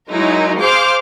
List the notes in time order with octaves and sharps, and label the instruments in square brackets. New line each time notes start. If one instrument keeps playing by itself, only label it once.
[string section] F#3 G#3 D#4 E4 A#4
G#4 C5 F5 D6 F6